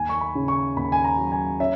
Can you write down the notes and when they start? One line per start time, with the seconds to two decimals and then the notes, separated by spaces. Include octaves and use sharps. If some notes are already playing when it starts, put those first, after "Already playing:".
Already playing: D#2 G#5
0.09 C#6
0.21 B5
0.35 C#3
0.48 C#6
0.76 D#2 B5
0.92 G#5
1.04 A#5
1.18 F#3
1.32 G#5
1.60 C#4 E5